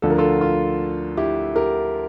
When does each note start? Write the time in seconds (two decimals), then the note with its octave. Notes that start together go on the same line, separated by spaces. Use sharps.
0.02 D2 D3 F3 A4
0.10 A#4
0.18 F4 A4
0.41 F4
1.17 E4 G4
1.56 G4 A#4